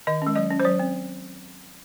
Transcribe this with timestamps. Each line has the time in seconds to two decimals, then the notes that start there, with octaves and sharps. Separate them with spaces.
0.07 D#3 D#5
0.22 G#3 C#4
0.35 F#3 D#5
0.51 C#4
0.60 C5
0.65 F#3 C#5
0.79 C4